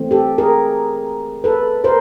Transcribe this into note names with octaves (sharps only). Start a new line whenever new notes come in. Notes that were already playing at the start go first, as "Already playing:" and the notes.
Already playing: E3 A3 C4
G4 A4
G#4 A#4
A4 B4
A#4 C5